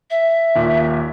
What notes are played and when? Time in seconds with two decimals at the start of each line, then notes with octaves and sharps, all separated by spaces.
0.11 E5
0.55 D#2 A#2